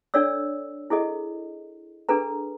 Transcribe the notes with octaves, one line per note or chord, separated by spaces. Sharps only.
D4 A4 C#5 D5 E6
E4 G#4 A4 D#5
D4 G#4 A4 B4 A#5